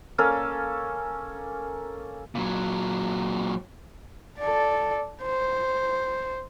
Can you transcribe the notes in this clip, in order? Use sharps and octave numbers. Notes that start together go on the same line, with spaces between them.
A#3 C#4 A4 F5
A#2 F#3
A4 D5
C5